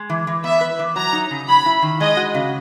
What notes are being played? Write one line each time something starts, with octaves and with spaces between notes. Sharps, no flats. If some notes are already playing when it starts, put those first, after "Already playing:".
Already playing: G#3
E3
E3
B3 E5
B4
E3
F#3 A#5
D#4
C#3
F#3 B5
E4
D#3
G#3 D#5
F#4
C#3